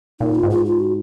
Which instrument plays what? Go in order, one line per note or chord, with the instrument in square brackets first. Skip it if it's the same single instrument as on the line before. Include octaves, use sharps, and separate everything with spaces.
[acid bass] A#2 [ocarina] D#4
[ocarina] F4
[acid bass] G#2
[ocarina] F4
F4
F#4